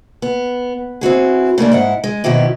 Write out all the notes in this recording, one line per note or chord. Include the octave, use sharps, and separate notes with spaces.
B3
C4 E4 F#4 G#4
C#3 A3 A#3 D4
G#2 E4 F#5
G#3
B2 D#3 F3 E4 G4